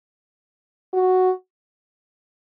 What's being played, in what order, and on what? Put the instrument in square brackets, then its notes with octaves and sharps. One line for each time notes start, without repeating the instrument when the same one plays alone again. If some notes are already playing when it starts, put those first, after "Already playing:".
[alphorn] F#4